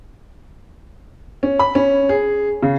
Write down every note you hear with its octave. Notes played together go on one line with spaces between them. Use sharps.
C#4
B5
C#4
G#4
C#3